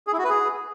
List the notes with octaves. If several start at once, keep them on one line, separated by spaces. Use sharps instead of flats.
G#4
E4
F#4
B4
G#4